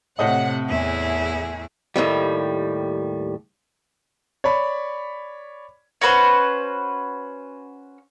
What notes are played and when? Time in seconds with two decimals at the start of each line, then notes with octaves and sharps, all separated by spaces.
0.19 A2 C3 D#5 F#5
0.69 E2 E4 G#4
1.96 D#2 A2 D#3 G3
4.44 C#5 D5 B5
6.02 C#4 F#4 B4 C5